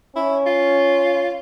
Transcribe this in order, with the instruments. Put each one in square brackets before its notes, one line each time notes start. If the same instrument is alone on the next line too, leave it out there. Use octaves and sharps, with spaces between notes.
[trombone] C#4 [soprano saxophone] E4
[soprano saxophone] F4